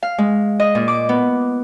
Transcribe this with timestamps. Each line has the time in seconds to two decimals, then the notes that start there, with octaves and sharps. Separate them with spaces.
0.03 F5
0.18 G#3
0.60 D#5
0.75 A#2
0.88 D6
1.09 B3